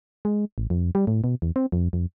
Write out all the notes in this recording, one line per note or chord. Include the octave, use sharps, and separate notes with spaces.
G#3
A1
F2
G3
A2
B2
E2
C4
F2
F2